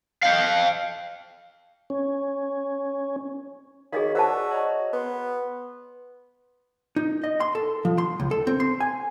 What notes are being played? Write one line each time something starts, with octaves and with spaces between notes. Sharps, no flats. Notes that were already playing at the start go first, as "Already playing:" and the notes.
F5 G5
C#4
D#3 F#4 G#4 C#5 D#5 F5
F#4 C5 D5 F#5 A5 E6 B6
C#5 D#5 A#5
B3 B4 C6
D#4
D#5
C6
A4
F3
C6
C#2
A4
C4
C6
G#5